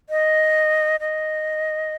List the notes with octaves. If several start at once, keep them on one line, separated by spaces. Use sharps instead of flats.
D#5
D#5